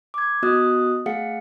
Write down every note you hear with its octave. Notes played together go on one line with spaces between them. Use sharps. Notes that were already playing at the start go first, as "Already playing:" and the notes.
D6 G#6
B3 F#4 D#5 D#6 F#6
A3 G#4 F5 F#5 C#7